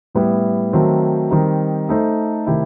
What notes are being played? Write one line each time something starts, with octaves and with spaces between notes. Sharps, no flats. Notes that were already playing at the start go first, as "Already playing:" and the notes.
A2 G3 B3 E4
D#3 F#3 A3 C4 F#4
D#3 G3 C4 D#4
A3 D#4 A4 C5
C3 D#3 A3 E4 G4